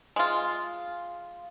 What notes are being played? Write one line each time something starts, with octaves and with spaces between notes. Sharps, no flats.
G#3 F4